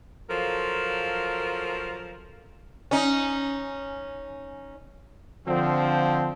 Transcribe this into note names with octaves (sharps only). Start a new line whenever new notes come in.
F3 F#3 F4 A4 A#4
C#4 D#4
D3 F3 C4